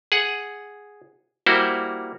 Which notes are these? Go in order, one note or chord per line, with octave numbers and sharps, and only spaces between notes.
G#4 F#5
G3 A#3 E4 F#4 C5